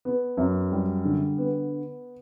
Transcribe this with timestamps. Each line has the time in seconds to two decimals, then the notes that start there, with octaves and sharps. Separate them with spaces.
0.05 B3
0.37 F#2
0.72 G3
1.05 D3
1.38 B3